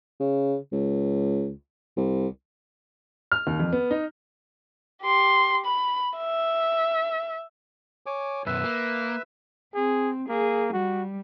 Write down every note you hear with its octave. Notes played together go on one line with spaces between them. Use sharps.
C#3
C#2
C2
F6
D#2
F2
B3
D#4
G4 C6
B5
E5
C#5 G#5 D6
F#2 B2 B4 E5 E6
A#3
C4 G#4
A#3 G#4
G3 F#4